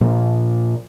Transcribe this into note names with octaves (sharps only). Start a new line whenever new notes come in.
A#2 F3 A#3